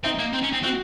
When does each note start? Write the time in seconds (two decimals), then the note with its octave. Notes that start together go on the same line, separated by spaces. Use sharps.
0.04 C4 D#4
0.19 A#3
0.33 C4
0.43 C#4
0.53 C4
0.63 C4 F#4